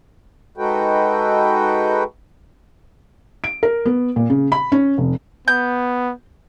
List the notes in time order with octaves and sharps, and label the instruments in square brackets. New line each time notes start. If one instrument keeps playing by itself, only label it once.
[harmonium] G#3 D#4 F#4 A4 B4 G5
[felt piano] D7
A#4
B3
A#2
C#3
B5
C#4
F1
[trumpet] B3 [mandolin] G6